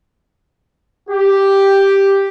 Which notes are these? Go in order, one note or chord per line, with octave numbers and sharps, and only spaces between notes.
G4